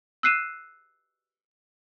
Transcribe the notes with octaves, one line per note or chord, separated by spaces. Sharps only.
E6 F#6 C7 D#7 E7